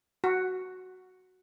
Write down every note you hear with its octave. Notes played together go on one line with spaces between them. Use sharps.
F#4